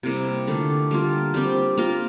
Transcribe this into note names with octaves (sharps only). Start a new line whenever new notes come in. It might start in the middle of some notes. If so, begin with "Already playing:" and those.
C3 G3 A#3 E4
D3 A3 D4 F4
G3 A#3 F4
G3 C4 G4
A#3 F4 A#4